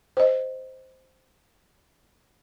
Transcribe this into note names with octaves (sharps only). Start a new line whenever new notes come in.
C5 D#5